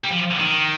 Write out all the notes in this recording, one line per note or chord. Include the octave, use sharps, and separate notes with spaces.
G3
F3
D#3